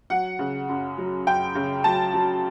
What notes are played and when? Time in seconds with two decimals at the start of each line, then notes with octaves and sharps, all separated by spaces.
0.10 F#3 F#5
0.39 C#3
0.69 F#2
0.98 F#3
1.27 F#2 G5
1.55 C#3
1.84 F#3 A5
2.14 F#3